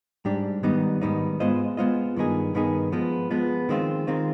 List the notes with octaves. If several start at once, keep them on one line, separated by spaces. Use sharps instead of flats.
G#2 G3 D4 G4
G#2 D#3 G3 B3 D#4
G#2 D#3 G3 B3 D#4
G#3 B3 F4 C5 D#5
G#3 B3 F4 C5 D#5
G2 D#3 B3 D#4 G#4
G2 D#3 B3 D#4 G#4
F3 G#3 B3
F3 G#3 B3
D#3 G#3 C4 F4
D#3 G#3 C4 F4